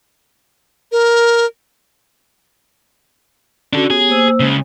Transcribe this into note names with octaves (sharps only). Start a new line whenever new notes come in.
A#4
C#4 D4 F#4 A4
B3 G4 G#4 C#5
A#3 C5 E6
C#3 G#3